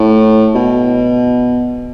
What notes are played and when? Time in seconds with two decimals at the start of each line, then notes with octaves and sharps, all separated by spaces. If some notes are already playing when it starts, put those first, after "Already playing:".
Already playing: A2
0.55 B2